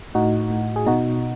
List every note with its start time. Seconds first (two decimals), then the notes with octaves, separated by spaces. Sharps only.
0.15 A2 D#4 F#4
0.50 A2
0.76 G#4
0.86 B2 D#4 F#4